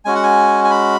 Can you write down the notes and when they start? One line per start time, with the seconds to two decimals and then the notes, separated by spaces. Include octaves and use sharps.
0.05 G#3 C#4 F#4 G#5
0.15 F#5
0.24 G#5
0.64 G#5
0.71 B5